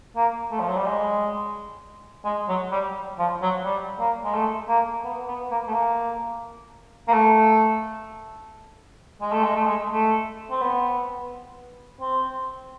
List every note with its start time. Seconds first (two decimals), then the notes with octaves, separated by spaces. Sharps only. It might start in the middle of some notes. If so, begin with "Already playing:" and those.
0.16 A#3
0.51 A3
0.60 F3
0.68 F#3
0.77 G3
0.86 G#3
2.25 G#3
2.49 F#3
2.72 G3
3.18 F3
3.42 F#3
3.64 G3
4.00 A#3
4.25 G#3
4.35 A3
4.69 A#3
5.05 B3
5.27 B3
5.51 A#3
5.68 A3
5.73 A#3
7.08 A#3
7.12 A3
9.21 G#3
9.32 A3
9.44 G#3
9.55 A3
9.67 G#3
9.92 A3
10.51 C4
10.61 B3
12.01 C4